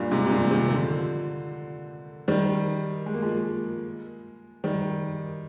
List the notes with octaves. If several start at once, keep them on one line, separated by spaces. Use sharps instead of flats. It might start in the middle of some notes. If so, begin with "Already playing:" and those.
Already playing: G2 A#2
G#2 C3
C3
G2 A#2
C3 D#3
D3 F3
D#3 G3
G#3
A#3
F3 G#3
D#3 G3